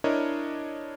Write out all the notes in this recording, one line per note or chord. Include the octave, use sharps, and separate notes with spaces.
D4 E4 A#4 C#5 D#5